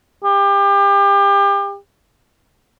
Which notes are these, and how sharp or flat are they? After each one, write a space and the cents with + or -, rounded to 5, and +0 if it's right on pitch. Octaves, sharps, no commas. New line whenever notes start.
G4 +30